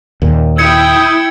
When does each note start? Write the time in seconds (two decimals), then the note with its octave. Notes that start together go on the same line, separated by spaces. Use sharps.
0.22 D#2 A#2
0.58 E4 G5 D#6 G#6 C#7